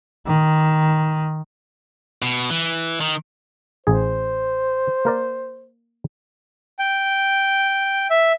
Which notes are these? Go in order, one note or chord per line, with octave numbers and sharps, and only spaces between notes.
D#3
B2
E3
D#3
A1 G#4 C5
A#3 A#4 D5
G5
E5